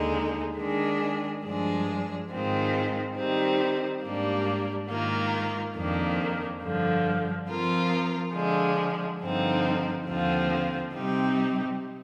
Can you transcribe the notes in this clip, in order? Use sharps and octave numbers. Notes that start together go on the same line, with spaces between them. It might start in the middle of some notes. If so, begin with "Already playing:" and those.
Already playing: D#2 D3 G#3 D#4
D#3 G#3 D4 G#4
G2 F3 G#3 D4 G#4
G#2 D#3 G#3 C4 F4
D#3 G3 C4 D#4
G#2 G3 A#3 D4
G#2 D#3 A#3 F4
F2 D#3 A#3 D4
G2 D3 F3
F3 C4 F4 A#4
D3 F3 G#3 D4
G2 D3 F3 C4 D#4
D#2 D3 F3 C4 F4
C3 G3 C4 D#4 G4